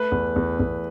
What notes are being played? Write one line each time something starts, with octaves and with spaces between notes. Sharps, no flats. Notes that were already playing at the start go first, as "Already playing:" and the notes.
Already playing: A3 B4
E2
E2
E2